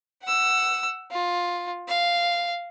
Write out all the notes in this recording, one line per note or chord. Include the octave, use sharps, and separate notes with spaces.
F#5 E6
F4
F5